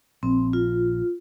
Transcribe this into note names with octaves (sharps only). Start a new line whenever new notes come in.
A#1 C4
F4